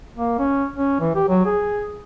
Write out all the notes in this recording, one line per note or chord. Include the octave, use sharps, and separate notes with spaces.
A#3
C#4
C#4
E3
G4
F#3
G#4